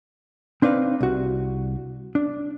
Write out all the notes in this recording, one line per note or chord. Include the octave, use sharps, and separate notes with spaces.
C4 D4 D#4 B4 F5
C2 F#4
D4